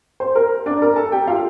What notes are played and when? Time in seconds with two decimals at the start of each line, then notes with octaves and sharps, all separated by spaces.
0.20 C5
0.35 A#4
0.66 D4 D5
0.82 A#4 A#5
0.96 A4 A5
1.12 G4 G5
1.27 F4 F5